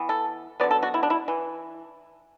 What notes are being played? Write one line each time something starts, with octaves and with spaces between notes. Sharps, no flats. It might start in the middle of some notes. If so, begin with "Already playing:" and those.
Already playing: E3 B3
A4
D3 F#3 B3 D5
A4
F#4
E4
D4
E4
E3